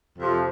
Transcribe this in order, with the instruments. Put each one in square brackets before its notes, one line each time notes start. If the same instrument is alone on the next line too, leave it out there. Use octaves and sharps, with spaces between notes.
[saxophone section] F2 C3 F3